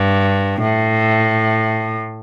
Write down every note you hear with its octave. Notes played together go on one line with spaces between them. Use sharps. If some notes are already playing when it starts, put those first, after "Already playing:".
Already playing: G2
A2